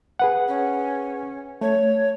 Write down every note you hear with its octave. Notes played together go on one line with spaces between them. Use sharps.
G#4 B4 F#5
C#4
A3 C#5